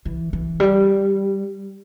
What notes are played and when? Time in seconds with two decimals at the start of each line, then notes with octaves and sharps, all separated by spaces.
0.05 E3
0.33 E3
0.60 G3